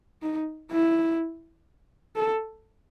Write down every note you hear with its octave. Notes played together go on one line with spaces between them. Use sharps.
D#4
E4
A4